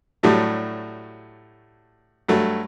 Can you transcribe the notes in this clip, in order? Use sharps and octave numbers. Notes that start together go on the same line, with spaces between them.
A2 F#3 G3 A3 D4
G2 F#3 A3